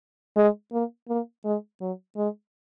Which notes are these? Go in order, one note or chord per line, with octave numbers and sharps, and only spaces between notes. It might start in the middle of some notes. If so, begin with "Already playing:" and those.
G#3
A#3
A#3
G#3
F#3
G#3